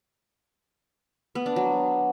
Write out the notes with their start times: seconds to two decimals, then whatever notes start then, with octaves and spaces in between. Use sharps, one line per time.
1.35 B3
1.46 D4
1.56 F#3